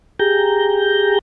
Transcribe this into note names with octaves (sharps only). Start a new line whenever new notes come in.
G4 G#4 A#5 G6